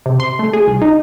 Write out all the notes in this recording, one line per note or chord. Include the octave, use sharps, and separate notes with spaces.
C3
C6
A3
G#4
C2
D#4